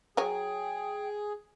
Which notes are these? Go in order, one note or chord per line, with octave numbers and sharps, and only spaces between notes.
F#3 G#4 C#5 G5 G#5